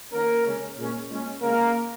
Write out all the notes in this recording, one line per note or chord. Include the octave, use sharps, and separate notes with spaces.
D#3 A#3 C#4 A#4
C#3 G#3 C#4
A#2 G#3 C#4
A#2 G#3 C#4
C#3 G#3 A#3 C#4 A#4